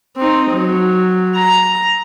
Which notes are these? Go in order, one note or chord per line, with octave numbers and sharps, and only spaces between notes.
C4 D#4
F#3
A#5